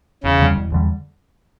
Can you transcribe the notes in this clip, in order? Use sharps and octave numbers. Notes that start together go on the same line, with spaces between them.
E1 C#3
E2 D3 G3
E1
E2 D3 G3